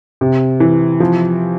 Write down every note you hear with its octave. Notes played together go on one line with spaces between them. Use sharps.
C3
E3
F3